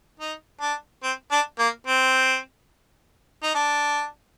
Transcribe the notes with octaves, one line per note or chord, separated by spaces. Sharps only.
D#4
D4
C4
D4
A#3
C4
D#4
D4